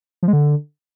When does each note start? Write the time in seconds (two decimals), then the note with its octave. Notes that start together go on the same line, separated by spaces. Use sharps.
0.23 F3
0.28 G#3
0.33 D3